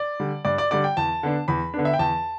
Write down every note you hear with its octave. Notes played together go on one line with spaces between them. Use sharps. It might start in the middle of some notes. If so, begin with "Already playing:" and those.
Already playing: D5
D3 G3
G2 D5
D5
D3 G3 D5
G5
E2 A5
D3 B3 D4
E2 B5
D3 B3 D4
E5
G5
E2 A5